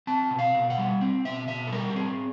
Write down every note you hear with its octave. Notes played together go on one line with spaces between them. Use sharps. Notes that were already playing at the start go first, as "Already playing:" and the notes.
C4 A5
B2
F5
B2
F#5
G3
C4
B2 E5
B2 E5
A4
G3 A#4
G4
C4 G#4